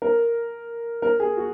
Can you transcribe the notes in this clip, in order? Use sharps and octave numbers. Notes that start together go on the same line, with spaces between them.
A#4
A#4
G#4
F#4